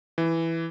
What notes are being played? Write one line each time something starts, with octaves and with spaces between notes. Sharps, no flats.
E3